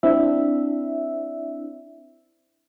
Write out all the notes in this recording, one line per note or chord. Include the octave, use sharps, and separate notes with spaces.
C4 D4 E4 E5